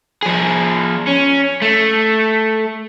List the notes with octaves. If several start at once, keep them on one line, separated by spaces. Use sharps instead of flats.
F3 G#4
C#4
A3